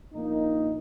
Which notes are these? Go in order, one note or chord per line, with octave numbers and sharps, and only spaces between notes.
A#1 A#3 D#4